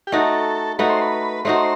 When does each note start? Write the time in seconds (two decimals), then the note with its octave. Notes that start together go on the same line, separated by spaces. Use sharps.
0.07 G4
0.12 A3 D#4 F#4 A4
0.79 A3 D#4 F#4 B4
0.89 C5
1.01 B4
1.45 A3 D#4 F#4 C5